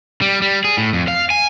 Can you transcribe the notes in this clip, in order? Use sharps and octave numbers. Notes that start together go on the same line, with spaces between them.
G3
G3
G#4
A2
F2
F5
G#5